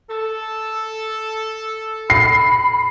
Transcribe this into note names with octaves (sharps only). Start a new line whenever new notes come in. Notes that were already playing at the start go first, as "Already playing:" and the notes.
A4
B5 C7